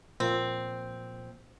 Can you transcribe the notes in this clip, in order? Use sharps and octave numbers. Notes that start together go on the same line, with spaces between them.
A#2 F3 A#3 C4